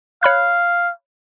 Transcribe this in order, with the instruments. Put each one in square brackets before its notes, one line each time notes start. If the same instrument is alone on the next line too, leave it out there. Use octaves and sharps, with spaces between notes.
[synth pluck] C#5 B5 F#6 [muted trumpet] F5